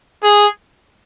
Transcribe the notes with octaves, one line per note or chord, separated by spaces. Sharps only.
G#4